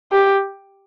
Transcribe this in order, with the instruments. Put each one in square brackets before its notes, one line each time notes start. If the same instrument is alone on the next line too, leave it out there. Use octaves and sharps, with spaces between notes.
[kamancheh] G4